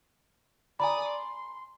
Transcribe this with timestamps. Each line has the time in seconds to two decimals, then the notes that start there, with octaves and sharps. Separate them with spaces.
0.80 D5 G#5 A#5 B5 D#6
1.09 C6